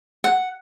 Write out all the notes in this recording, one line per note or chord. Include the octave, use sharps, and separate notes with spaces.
F#5